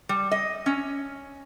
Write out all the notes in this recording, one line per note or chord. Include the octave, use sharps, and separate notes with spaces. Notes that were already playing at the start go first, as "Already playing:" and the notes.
G3
D#5
C#4